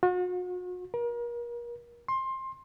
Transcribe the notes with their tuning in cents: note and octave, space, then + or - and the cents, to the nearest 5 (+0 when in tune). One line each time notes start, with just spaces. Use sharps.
F#4 -40
A#4 +35
C6 +20